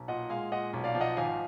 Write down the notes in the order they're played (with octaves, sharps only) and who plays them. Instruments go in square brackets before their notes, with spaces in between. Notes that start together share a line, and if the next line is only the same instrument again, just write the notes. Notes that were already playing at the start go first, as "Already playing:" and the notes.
Already playing: [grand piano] B1
A#2 D#5 F#5
G#3 F5 G#5
A#2 D#5 F#5
B1
D5 F5
F3
D#5 F#5
G#1 F5 G#5